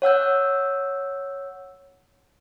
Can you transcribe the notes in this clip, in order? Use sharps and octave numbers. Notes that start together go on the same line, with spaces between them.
C#5 F#5 E6 G6